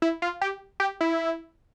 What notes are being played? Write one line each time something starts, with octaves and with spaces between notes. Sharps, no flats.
E4
F4
G4
G4
E4